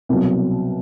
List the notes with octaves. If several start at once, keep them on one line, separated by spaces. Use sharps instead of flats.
C2 B2 F#3